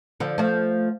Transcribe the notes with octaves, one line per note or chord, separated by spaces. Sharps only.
D3 F3
F3 A3